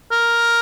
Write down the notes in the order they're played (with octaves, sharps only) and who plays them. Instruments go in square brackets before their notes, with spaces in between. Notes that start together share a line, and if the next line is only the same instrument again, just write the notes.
[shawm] A#4